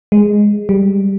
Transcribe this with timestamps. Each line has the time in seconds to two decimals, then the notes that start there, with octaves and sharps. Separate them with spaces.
0.12 G#3
0.69 G3